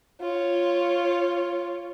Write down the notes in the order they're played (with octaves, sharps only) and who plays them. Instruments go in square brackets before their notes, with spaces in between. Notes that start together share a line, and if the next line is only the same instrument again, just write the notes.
[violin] F4 C#5